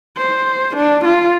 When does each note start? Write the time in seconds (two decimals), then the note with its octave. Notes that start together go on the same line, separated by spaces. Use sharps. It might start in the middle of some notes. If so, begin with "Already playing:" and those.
0.17 C5
0.76 D4
1.05 F4